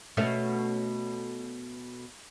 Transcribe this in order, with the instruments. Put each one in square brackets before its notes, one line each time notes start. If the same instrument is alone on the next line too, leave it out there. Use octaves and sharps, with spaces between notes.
[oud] B2 A3 C#4